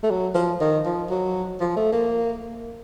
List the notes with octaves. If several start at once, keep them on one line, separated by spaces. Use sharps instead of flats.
A3
F#3
F3
D#3
F3
F#3
F3
A3
A#3